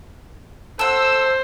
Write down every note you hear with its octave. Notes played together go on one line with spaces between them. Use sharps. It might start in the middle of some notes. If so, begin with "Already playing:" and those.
A4 C5 F#5 E6